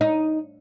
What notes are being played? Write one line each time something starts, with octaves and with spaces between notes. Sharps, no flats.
D#4